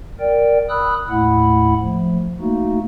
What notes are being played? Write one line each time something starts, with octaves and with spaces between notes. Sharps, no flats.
A#4 D5 G5
B5 D#6 E6 F#6
D#2 A2 A3 E4 F#5 B5
F3 A3
A3 A#3 D#4 F#4